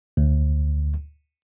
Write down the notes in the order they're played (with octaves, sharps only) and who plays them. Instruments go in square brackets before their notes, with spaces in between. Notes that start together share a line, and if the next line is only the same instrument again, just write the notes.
[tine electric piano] D2